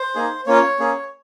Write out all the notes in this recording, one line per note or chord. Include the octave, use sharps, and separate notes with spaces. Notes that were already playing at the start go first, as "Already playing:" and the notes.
Already playing: C5
A#3 D#4 G#4
A#3 C#4 F4 C#5
A#3 C#4 G#4